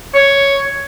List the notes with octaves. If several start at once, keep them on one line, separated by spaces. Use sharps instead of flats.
C#5